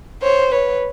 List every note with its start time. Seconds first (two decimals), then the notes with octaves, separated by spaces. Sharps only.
0.22 C5 C#5
0.52 B4 C#5